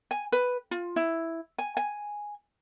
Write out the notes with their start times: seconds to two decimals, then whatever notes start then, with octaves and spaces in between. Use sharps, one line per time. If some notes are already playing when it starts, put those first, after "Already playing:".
0.11 G#5
0.32 B4
0.71 F4
0.96 E4
1.58 G#5
1.77 G#5